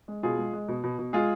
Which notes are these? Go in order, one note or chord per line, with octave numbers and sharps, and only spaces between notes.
G#3
B2 F4 G#4
G#3
G#3
B2
B2
B2
G#3 F4 G#4